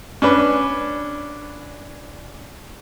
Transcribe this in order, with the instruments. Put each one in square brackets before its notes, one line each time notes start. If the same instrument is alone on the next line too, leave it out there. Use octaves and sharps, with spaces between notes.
[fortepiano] C#4 D4 B4